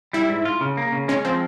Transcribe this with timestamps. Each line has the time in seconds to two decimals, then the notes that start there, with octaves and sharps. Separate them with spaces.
0.13 G3 E4
0.29 G#2
0.45 F4
0.61 C#3
0.77 A#3
0.92 C#3
1.08 G#3 C#4
1.25 F3 C4